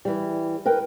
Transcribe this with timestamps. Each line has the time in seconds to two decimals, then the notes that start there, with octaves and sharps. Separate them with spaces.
0.05 E3 G3
0.66 A#4 B4 G5